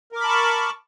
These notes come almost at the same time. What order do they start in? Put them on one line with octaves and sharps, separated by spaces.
A#4 D6 B5 A5 C#6